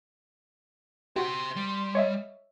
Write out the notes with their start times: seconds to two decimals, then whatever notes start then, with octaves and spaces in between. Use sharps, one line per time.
1.16 F#4 G4 C5 E5 C6
1.56 G3
1.95 C#5 D#5 E5